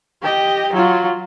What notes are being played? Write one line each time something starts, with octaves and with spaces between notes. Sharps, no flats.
G4 D#5
F#3 F4